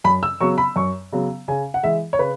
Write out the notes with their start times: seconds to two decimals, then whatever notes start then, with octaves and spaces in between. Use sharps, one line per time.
0.04 F#2 B5
0.23 E6
0.41 C#3 F#3 B3 C#6
0.58 B5
0.76 F#2 C#6
1.13 C#3 F#3 B3
1.48 C#3 G#5
1.74 F#5
1.83 E3 G#3 E5
2.13 C#5
2.19 C#3 B4